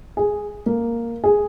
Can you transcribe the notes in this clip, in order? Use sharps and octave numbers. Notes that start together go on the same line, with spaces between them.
G#4
A#3
G#4